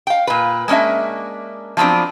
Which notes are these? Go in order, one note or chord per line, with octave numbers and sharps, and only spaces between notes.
F5 G5
A#2 B4
G#3 A#3 C#4 D4 E5
F3 F#3 B3 C4 D4